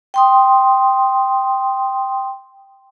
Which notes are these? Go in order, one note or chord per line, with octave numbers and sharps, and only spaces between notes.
G5 C6 D#6